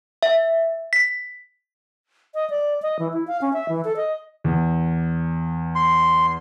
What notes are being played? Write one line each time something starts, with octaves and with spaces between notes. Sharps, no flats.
E5
B6
D#5
D5
D#5
E3
E4
F5
C#4
E5
E3
A4
D#5
E2
C6